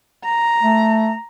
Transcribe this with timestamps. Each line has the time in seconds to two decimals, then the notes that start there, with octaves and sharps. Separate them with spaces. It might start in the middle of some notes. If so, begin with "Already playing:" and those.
0.25 A#5
0.63 A3